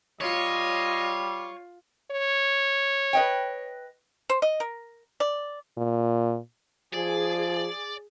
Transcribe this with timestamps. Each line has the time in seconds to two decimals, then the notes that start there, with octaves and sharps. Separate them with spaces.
0.21 G3 F4 C#5 D#5
2.12 C#5
3.13 B4 D#5 G5
4.29 C5
4.42 D#5
4.60 A#4
5.20 D5
5.77 A#2
6.93 F3 G#4 D5